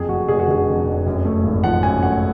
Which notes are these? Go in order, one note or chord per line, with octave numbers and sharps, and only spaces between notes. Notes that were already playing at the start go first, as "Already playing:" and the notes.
Already playing: F#1 F2 G#4
F1 F#4
F1 G#4
F#4
D3 G#4
F2
F1
F#2
A3
G#1
F3 F#5
F#2 G#5
A3 F#5